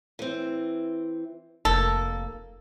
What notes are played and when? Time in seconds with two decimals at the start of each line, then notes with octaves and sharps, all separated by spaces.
0.19 E3 C4
1.65 F1 A#3 A4